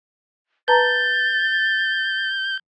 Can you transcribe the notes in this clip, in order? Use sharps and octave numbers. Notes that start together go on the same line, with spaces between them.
B4 A5 A#5 G6 A6